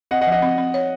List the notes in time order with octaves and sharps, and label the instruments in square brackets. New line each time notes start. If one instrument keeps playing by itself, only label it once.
[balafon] C4 [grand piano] D#5 F#5
[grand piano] D#5 F#5
[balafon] F3
[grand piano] D#5 F#5
[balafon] C4
C4
C#5